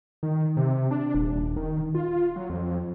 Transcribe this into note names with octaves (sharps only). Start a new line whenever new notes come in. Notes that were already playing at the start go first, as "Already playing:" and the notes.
D#3
C3
D4
D#1
D#3
F4
F#3
F2